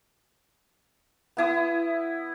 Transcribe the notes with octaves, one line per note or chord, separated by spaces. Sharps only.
B3 E4 D#6